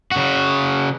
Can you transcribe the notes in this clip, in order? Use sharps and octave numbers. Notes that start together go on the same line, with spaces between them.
C#3 F#4